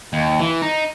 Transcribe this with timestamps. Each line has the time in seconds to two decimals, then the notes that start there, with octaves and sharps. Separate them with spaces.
0.13 D#2
0.40 E3
0.62 D#4